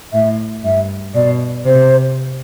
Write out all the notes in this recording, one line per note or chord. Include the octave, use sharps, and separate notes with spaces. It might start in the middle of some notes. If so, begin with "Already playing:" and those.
A2 E5
G2 E5
B2 D5
C3 C5